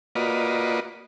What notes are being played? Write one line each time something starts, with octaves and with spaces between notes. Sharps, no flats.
A#3 F4 F#4 B4 D5 D#5